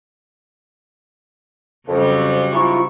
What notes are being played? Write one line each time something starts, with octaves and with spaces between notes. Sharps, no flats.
F2 C#3 F#3 G3
G#2 E4 F4 C#6